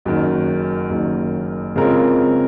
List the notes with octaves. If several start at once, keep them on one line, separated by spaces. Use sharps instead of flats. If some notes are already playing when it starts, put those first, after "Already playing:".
F#1 F#2 D#3
F#1 F#2 D#3
C#3 G#3 C4 F4 A#4